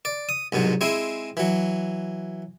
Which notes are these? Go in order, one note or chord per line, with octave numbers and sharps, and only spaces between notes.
D5
D#6
C2 G#2 B2 F#3
G#3 C4 E4 G#4
E3 F#3